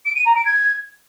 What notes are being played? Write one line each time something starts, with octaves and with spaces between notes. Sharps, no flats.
D7
D#7
A#5
D7
G#6